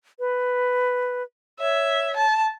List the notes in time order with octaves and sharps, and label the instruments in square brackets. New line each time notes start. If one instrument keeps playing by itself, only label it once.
[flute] B4
[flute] C#5 [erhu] E5
[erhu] A5